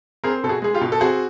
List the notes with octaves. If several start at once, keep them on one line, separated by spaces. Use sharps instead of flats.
C4 G#4 A#4
B2 A4
F#4 G#4
G#3 G#4
F4 G4
B2
A4
C4 F#4 G#4